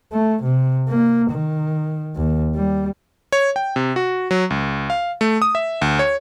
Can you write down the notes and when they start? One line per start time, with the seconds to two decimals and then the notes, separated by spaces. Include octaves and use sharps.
0.13 A3
0.43 C3
0.89 A#3
1.31 D#3
2.16 D#2
2.56 G3
3.32 C#5
3.56 G5
3.76 C3
3.96 F#4
4.31 F#3
4.50 C#2
4.90 F5
5.21 A3
5.42 D#6
5.55 E5
5.82 D2
5.99 C#5